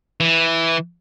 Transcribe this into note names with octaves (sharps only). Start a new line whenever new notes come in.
E3